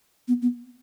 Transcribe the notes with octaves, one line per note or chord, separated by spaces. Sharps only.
B3
B3